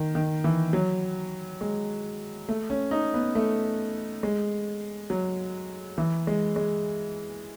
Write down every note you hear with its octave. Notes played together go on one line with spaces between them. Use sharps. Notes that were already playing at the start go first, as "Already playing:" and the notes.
Already playing: D#3
D#3
E3
F#3
G#3
A3
C#4
D#4
B3
A3
G#3
F#3
E3
G#3
G#3